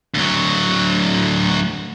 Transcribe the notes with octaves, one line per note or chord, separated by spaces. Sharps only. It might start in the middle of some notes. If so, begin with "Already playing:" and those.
D2 F#3